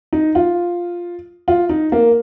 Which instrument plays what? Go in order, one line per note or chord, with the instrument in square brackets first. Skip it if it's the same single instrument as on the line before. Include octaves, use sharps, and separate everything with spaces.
[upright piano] D#4
F4
F4
D#4
A#3